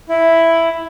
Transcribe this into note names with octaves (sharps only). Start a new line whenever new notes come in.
E4